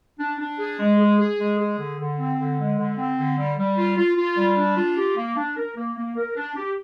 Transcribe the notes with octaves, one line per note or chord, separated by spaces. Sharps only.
D4
D4
G#4
G#3
G#4
G#4
G#3
G#4
D3
D3
C4
D3
G#3
D3
C4
D3
G3
G3
F4
F4
F4
G3
D4
F4
G4
A#3
D4
A#4
A#3
A#3
A#4
D4
G4